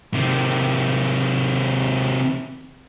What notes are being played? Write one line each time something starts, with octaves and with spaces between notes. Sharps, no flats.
C3 D#3